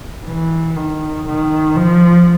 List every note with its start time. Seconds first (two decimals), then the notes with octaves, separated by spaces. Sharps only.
0.28 E3
0.77 D#3
1.28 D#3
1.77 F3